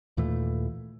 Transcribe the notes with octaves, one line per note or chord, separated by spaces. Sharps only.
D#2 A#2 E3 A3